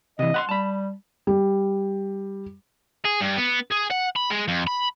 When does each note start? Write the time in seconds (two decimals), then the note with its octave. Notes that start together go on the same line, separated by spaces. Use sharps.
0.19 C3 E3 D#5
0.34 F#5 B5 C6
0.49 G3 A5 B5
1.27 G3
3.05 G#4
3.21 G2
3.37 B3
3.71 G#4
3.90 F#5
4.16 B5
4.30 G#3
4.48 F2
4.67 B5